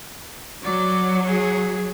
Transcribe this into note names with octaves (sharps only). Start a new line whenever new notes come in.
F#3 D5
G#4